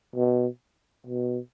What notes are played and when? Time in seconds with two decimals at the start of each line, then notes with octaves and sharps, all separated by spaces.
0.15 B2
1.07 B2